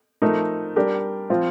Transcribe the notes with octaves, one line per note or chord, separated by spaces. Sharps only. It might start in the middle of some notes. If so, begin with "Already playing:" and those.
F3 A3 D#4 A#4
G3 D4 G4 A#4
F3 C4 F4